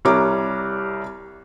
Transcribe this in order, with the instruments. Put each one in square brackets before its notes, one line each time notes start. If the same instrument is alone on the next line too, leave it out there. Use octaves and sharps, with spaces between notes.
[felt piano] C2 G3 C#5 A#5 D6